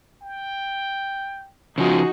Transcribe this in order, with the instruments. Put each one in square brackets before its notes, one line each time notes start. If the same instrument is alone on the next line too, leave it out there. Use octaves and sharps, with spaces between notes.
[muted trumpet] G5
[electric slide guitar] C#3 F3 [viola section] D#4 F#4 [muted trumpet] G#4